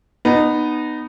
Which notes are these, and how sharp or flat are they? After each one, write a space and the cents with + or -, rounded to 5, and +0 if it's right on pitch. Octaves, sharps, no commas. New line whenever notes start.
B3 +0 D#4 -20